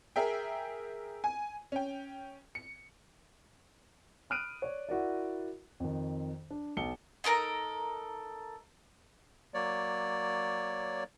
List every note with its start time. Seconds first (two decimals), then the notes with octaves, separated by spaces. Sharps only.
0.16 G#4 A#4 E5 G5
1.24 G#5
1.72 C#4 G5
2.55 C#7
4.30 B5 D#6 F6 F#6 D7 D#7
4.62 C#5 D5
4.89 E4 F#4 A#4 D5
5.80 F2 D#3
6.50 D4
6.77 B1 C#7 G7
7.24 D#4 A4 A#4 A#5
9.54 F#3 A#3 C#5 D5